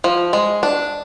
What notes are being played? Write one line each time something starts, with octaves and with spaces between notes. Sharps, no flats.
F3
G#3
D4